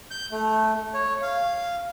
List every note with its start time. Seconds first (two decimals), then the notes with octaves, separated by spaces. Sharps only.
0.11 G6
0.32 A3
0.94 C#5
1.22 F5